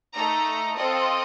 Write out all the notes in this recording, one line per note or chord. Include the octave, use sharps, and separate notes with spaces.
A3 D#4 A4 A#5
C4 F4 A4 D#5